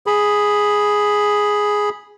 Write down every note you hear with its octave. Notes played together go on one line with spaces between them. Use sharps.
G#4 B5